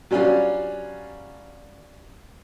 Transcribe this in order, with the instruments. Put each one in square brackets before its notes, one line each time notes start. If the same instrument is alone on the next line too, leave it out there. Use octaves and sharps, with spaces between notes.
[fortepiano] F#3 G3 C#4 D4 F4